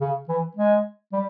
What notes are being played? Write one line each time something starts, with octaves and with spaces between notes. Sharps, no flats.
C#3
E3
G#3
G3